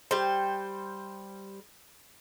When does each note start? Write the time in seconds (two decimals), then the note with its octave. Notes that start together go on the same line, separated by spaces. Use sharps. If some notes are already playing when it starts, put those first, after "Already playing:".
0.11 G3 C5